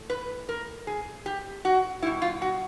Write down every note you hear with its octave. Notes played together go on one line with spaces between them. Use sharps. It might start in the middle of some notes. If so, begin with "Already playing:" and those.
Already playing: A2
B4
A#4
G#4
G4
F#4
B2 G3 E4
F4
F#4